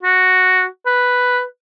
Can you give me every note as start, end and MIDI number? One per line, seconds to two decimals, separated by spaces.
0.03 0.66 66
0.86 1.43 71